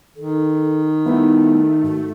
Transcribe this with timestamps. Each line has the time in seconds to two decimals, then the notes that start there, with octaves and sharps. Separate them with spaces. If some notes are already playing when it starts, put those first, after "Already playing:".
0.16 D#3 A4
1.06 G3 A3 B3 D#4 E4
1.83 G#2 F#4